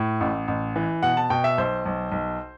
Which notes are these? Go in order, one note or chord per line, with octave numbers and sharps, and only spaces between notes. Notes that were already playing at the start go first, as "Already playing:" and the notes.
Already playing: A2
A1
A1
E3
B2 F#5
A5
B2 G5
E5
B1 C5
B1
B1